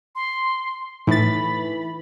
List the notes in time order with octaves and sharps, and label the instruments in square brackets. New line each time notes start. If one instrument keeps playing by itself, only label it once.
[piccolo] C6
[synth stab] A2 A6 [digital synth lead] E3 [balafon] D#4 [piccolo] B5